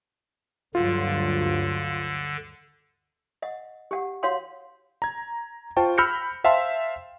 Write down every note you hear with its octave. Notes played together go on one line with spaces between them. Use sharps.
D2 G2 D3 F#3 F4
D#5 F#5
G4 F#5
F#4 C#5 F5 F#5 C6
A#5 G#6
F4 C5 G5 A5 C#6
B5 E6 F6 G6 A#6 C#7
C5 E5 F5 G5 A5 C6